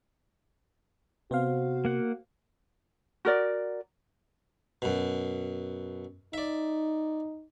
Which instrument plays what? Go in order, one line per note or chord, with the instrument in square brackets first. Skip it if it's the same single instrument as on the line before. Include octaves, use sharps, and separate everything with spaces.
[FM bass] C3 [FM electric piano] B3 C5 F5 [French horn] F#4
[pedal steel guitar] A#3 F#5
[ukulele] F#4 A#4 D5
[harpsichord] F#2 B2
[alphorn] D#4 [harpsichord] D5 E5